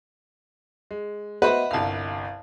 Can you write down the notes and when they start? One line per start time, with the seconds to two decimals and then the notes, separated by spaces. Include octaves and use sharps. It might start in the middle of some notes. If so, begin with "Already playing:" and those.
0.91 G#3
1.42 B3 F#4 B4 C5 D#5 E5 F#5
1.71 G1 C2 F5 A5